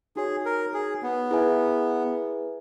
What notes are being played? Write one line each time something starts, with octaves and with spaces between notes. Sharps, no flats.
D#4 F#4 G#4 C#5
A#4
G#4
B3
E4 G#4 B4 E5 G#5